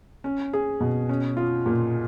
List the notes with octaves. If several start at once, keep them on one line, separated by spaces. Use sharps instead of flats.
C#4
G#4
B2
C#4
F4
A#2